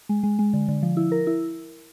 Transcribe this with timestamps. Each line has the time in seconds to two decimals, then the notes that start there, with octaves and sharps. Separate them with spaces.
0.09 G#3
0.23 G#3
0.39 G#3
0.53 D3
0.68 D3
0.83 F3
0.97 E4
1.12 A#4
1.27 E4